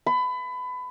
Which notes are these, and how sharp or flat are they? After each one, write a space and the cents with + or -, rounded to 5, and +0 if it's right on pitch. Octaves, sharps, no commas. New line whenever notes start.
B5 +25